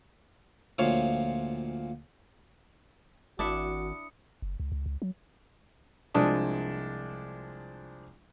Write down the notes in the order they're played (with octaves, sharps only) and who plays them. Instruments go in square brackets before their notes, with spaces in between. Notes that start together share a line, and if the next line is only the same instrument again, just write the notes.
[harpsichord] D2 A#2 F3 C#5 F5
[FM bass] G#1 [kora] D4 E4 E5 [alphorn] F#4 [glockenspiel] D#6 C#7
[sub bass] F#1
C#2
C#2
C#2
F#3
[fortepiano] C2 F3 G#3 D4 A5 D#6